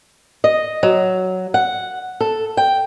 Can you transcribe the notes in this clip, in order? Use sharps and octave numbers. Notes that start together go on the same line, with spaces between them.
D#5
F#3
F#5
A4
G5